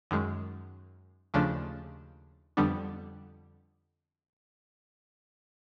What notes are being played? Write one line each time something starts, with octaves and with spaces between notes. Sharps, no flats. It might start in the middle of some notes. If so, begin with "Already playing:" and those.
F#2 D#3 G#3
D#2 C#3 F3 A3 D4
F2 D3 G3 B3 D4